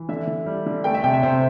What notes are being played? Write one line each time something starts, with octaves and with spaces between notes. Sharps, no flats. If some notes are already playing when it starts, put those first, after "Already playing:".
Already playing: E3
D3 E5
D3
G3
D3
A3 G5
E5
C3 G5
E5
C3 C5